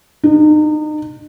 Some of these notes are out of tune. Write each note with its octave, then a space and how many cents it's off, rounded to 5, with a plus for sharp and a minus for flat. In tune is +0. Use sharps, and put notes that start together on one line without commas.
D#4 -35